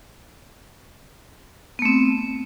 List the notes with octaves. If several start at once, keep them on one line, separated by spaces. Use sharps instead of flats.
A3 B3 C4